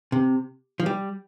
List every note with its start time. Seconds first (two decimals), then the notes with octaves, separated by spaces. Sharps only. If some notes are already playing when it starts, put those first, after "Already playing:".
0.12 C3
0.80 F3
0.86 G3